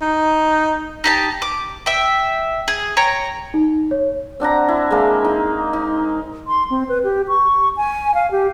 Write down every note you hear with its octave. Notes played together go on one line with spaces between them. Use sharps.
D#4
D#4 G4 A5
D6
E5 G5
G#4
C#5 G5 A#5
D#4
C#5
C4 D4 F#5 A#5
E4
G#3 A#3
D#4
D#4
C6
C4
B4
G4
C#6
G#5
F5
G4